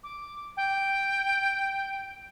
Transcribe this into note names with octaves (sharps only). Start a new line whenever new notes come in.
D6
G5